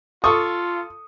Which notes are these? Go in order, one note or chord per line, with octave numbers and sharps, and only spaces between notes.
F4 A4 C#6 D#6